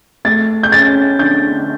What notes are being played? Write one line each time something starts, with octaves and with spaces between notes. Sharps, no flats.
A3 A6
G6
C#4 A6
D3 G6